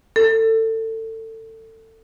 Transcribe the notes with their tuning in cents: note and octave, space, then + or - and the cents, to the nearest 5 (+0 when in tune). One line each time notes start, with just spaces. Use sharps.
A4 +25